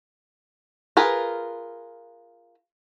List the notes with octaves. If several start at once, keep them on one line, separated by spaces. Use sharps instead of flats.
F4 G#4 A#4 B4